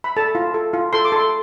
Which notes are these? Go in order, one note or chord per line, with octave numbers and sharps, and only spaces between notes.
B5
A4 A5
F4
A4
F4
A4 C6
D6
A4 C6